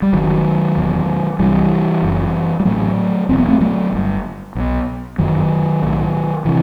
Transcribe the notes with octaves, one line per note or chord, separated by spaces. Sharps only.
G3
F#1 F#2 D#3 F#3
E1 E2 B2
C2 C3 E3 G3
F#1 F#2
G3
A1 A2 F#3 A3
E1 E2 B2 C4
B3
A3 C4
F#3 A3
G1 G2
B1 B2
G1 F#2 D#3 F#3
B1 A2
C3 E3